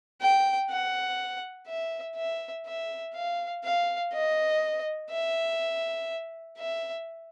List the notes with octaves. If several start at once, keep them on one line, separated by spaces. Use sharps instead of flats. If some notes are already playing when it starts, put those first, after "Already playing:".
G5
F#5
E5
E5
E5
F5
F5
D#5
E5
E5